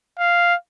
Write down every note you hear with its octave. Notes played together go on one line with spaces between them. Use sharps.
F5